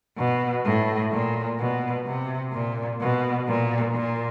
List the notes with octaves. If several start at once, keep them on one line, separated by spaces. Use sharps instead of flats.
B2
A2
A#2
B2
C3
A#2
B2
A#2
A#2